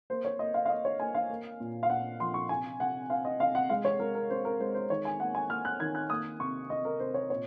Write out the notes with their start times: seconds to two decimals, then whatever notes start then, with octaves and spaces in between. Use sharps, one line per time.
0.10 A#3 C5
0.25 C#5
0.39 A#3 D#5
0.54 F5
0.65 F5
0.70 A#3 D#5
0.85 C#5
1.00 A#3 G#5
1.15 F5
1.30 A#3
1.60 A#2
1.83 F5
1.90 A#2 F#5
2.20 F3 C6
2.34 C#6
2.49 C3 G#5
2.80 C3 F#5
3.10 C4 F5
3.25 D#5
3.40 C3 F5
3.55 F#5
3.70 G#3 F5
3.85 C#5
3.99 G#3 A#4
4.15 A#4
4.30 C4 C5
4.45 A#4
4.60 G#3 C5
4.74 C5
4.90 D#3 C#5
5.05 G#5
5.20 A#3 F#5
5.35 G#5
5.50 A#3 F6
5.65 F#6
5.80 D#3 G#6
5.95 F#6
6.10 A#3 D#6
6.40 C3 C#6
6.70 C3 D#5
6.85 A#4
7.00 C3 C5
7.14 C#5
7.30 A#2 C#5